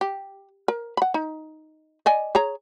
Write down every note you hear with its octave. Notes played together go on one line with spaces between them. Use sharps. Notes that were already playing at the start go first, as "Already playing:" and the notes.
G4
A#4
F#5 B5
D#4
D5 D#5 G#5
G#4 C#5 A#5